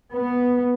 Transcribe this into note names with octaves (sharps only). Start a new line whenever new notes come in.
B3